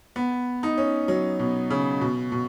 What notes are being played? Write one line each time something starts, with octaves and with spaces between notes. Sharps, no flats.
B3
D#4
C#4
F#3
B2
C#3
B2
B2